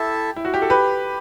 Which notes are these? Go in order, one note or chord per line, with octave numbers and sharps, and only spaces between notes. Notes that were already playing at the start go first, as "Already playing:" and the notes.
Already playing: E4 G4 A4 E5 A5
E4
F#4
G4
A4
G4 B4